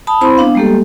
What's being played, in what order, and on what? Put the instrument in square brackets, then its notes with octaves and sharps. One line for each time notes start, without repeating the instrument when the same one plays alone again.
[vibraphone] A5 B5 D#6
C4 E4 C5 B5 C6
B3 D4 F5
G3 G#3 A#3 G4 A4